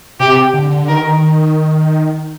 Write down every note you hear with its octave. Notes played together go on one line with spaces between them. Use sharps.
C3 G4
D3
D3
D#3 A#4